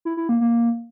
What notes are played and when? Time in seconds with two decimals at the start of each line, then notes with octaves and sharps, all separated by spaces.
0.05 E4
0.17 E4
0.29 A#3
0.41 A#3